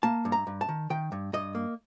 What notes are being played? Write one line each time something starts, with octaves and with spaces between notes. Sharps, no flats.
A#3 A5
G2
A#5
G2
A5
D#3
D#3 G5
G2
G2 D#5
A#3